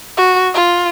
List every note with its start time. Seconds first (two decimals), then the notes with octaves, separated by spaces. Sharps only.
0.17 F#4
0.54 F4